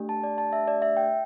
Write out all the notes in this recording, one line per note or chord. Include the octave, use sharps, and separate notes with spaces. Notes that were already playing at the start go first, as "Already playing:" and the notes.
Already playing: A3 D4 G4
A5
D5
A5
E5
D5
E5
G5